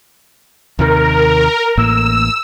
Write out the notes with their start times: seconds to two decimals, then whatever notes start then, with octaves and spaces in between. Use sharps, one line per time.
0.79 D#2 C3 D#3 A#4
1.77 A1 A2 A#3 E6